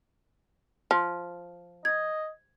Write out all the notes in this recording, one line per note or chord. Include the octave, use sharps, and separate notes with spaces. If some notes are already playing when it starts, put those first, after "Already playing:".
F3 F6
D#5 G#6